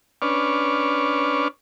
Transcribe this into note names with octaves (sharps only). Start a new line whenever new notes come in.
C#4 D4 B4 C#6 D6 F6